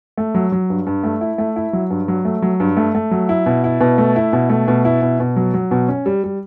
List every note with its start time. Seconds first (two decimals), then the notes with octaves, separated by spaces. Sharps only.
0.18 A3
0.35 F#3
0.52 F#3
0.70 G2
0.87 G2
1.04 A3
1.21 E4
1.38 A3
1.56 E4
1.73 F#3
1.90 G2
2.08 F#3
2.25 A3
2.42 F#3
2.60 G2
2.77 A3
2.95 A3
3.11 F#3
3.29 E4
3.46 B2
3.64 E4
3.81 B2
3.98 A3
4.16 E4
4.33 B2
4.50 A3
4.68 B2
4.85 E4
5.02 B2
5.20 B2
5.36 F#3
5.54 F#3
5.71 B2
5.89 C#4
6.06 G3
6.24 G3